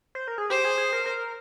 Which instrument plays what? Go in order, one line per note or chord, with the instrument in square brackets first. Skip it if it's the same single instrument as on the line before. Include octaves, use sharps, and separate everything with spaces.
[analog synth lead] C5
A#4
G#4
[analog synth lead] G4 [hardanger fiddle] C5
[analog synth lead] G#4
G#4
A#4
A#4